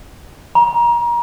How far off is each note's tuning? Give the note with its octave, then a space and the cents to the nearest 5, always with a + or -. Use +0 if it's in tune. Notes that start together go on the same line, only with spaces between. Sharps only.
A#5 +30